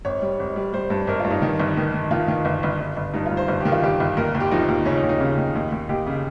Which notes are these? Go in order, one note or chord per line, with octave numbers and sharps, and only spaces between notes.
G#1 C#5
G3
G#1
G3
G3 C5
G2
G#1 A#4
G2 F4
D#4
D#3
G1
D#3
D#3
D#3 F4
D#3
G1
G1
G1
G1
G2 D#4
F4
G2
C5
G1
D#3 G4
F4
G1 G4
G1
D#2 A#4
D#2
G4
F3 D#4
D#2
C#3 C#4
D#4
D#2
D#4
C#3
D#2
D#2
D#2
D#2 G4
C#3